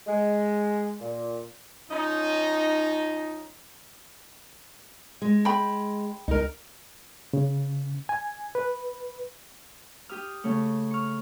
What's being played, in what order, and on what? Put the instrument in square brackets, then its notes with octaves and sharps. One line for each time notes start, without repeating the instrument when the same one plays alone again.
[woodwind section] G#3
A#2
[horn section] F3 C#4 D#4
[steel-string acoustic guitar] G#3
[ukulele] G5 B5
[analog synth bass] C#2 [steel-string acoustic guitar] D#4 A#4
[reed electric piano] C#3
G#5
B4
[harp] G4 D#6 F6
C#3 A3
C#6 F6